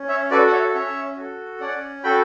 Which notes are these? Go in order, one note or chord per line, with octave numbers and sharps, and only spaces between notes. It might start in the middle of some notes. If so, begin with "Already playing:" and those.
Already playing: C#4
C#5 E5
F#4 A4 B4 D5
F#5
C#5 E5
C#4 C#5 E5
F#4 A4
C#4 D5 F#5
F#4 A4 G5 B5